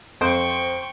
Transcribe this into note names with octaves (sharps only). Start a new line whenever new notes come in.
F2 C5 G5 C#6 D7